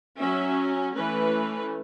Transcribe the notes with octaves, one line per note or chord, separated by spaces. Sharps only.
F#3 C#4 E5
E3 A3 C#4 B4